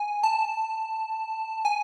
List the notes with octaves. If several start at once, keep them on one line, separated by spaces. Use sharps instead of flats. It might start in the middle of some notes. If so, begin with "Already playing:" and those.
Already playing: G#5
A5
G#5